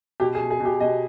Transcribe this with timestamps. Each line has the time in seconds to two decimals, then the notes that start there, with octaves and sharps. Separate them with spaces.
0.20 B2 G4
0.35 G#4
0.40 B2
0.50 G#4
0.60 B2 G4
0.80 B2 D#5